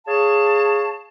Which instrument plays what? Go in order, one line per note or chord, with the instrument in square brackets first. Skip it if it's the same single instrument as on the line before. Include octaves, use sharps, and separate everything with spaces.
[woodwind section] G#4 C#5 F5 A5